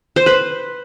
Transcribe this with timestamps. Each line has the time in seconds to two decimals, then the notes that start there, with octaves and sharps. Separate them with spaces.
0.16 C5
0.26 B4